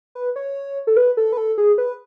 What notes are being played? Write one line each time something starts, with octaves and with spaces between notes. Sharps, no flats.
B4
C#5
A4
B4
A4
B4
A4
G#4
B4